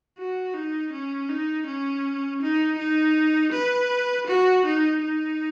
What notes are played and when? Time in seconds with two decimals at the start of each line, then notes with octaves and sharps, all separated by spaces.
0.18 F#4
0.54 D#4
0.92 C#4
1.29 D#4
1.66 C#4
2.41 D#4
2.78 D#4
3.52 B4
4.27 F#4
4.65 D#4
5.01 D#4